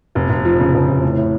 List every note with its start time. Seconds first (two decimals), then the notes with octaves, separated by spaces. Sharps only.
0.15 F1
0.30 F1
0.45 F3
0.60 C#3
0.74 F1
0.89 F1
1.02 A2
1.17 A2